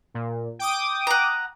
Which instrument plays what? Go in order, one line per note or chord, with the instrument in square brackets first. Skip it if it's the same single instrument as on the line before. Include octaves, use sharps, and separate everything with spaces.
[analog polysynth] A#2
G5 D6 D#6
[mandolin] F#5 A#5